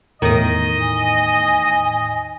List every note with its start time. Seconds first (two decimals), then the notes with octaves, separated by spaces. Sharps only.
0.22 E2 A2 D#3 D#5 D#6
0.81 G#5